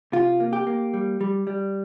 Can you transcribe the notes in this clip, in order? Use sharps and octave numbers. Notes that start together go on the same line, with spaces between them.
C3 F4
A#3
G4
A#3
G3
G3
G3